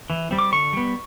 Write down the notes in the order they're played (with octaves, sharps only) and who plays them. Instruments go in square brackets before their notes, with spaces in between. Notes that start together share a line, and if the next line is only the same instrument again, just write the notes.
[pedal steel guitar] E3
G3 C4
D6
D3 C#6
G3 B3